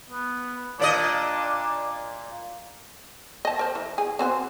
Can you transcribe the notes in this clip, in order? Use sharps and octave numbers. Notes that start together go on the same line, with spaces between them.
B3
A#2 D4 D5 D#5
D#5 A5
A#4 C5
E3
G#4
C4 F#4 C5